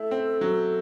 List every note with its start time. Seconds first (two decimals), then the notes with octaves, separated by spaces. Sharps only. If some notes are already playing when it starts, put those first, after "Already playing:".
Already playing: A3 E4 A4
0.11 C4
0.41 F#3